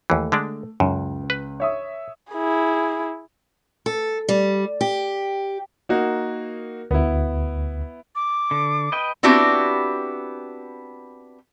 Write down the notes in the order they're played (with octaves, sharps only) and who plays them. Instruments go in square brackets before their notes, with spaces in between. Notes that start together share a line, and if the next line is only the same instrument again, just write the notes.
[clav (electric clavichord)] D#2 E3 [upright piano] A3
[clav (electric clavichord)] D3 G#3 D4
[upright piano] C#2 [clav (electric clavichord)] F#2
[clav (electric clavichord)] B4
[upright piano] C#5 E5 D#6
[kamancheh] E4 G#4
[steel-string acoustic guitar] A4
G3
G4
[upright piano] A#3 D#4 F#4
[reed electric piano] D2 [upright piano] B3 E4
[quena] D6
[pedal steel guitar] D3
B4 D#5 G5
[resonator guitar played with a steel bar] B3 C4 D4 E4 F#4 G4